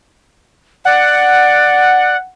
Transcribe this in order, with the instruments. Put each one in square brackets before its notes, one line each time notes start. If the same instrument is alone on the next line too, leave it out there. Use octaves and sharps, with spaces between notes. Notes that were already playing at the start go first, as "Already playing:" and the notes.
[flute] D5 [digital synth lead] F#5